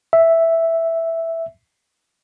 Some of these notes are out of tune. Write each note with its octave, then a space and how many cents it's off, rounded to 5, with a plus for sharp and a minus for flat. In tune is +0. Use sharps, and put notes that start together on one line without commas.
E5 +0